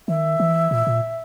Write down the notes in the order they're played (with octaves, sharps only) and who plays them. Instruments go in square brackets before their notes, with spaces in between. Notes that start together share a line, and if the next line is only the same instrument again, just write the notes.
[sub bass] D#3 [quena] E5
[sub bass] E3
A#2
A#2